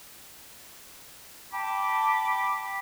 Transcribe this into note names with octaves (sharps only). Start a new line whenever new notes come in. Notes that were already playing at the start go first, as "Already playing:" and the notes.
G5 A5 B5 D6